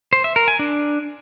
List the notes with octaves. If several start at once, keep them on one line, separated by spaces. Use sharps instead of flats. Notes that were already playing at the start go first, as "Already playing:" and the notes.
C5
E5
A#4
G#5
D4